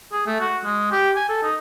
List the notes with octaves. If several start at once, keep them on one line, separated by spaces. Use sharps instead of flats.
G#4
A3
F#4
G#3
G4
G#5
A4
D#4